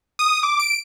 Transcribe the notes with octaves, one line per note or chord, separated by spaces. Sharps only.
D#6
D6
D7